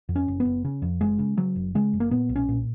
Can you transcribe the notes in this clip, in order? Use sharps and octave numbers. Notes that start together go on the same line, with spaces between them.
F2
C#4
F#1
B3
F#1
C#3
F2
F#1 G#3
C#3
C#3 F#3
F#1
C#3 G#3
F#1
A#3
A#2 B3
B1
C#4
A#2